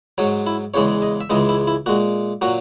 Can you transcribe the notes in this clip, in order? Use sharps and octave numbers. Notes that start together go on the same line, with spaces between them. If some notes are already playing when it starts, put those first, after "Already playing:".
G#2 F#3 C#5
E4
E2 C#3 E3 G#3 C#5
D#5
E5
C#2 C#3 E3 G#3 D#5
E4
E4
A#2 G#3 F#4
A#2 F#3 F#4